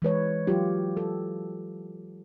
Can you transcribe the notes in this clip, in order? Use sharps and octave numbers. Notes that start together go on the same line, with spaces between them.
E3 G#3 B4 C#5
F#3 F4 G4
A4